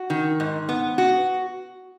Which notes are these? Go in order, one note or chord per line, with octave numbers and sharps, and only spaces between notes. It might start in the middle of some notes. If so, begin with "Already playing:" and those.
Already playing: F#4
D#3
G#2
B3
F#4